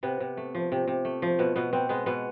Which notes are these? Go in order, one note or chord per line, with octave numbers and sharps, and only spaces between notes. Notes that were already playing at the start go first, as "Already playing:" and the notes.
C3 B3
C3
A3
F3
C3
C3
A3
F3
B2 B3
B2 B3
B3 C4
G#3 B3
B2 B3